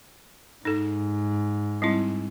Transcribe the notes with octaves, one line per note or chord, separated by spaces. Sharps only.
G#2 D#4 A4
G3 C4 E4